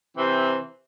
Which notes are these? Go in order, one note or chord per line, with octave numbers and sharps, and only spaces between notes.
C3 E3 C4